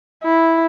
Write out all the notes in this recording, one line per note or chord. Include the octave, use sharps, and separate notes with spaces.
E4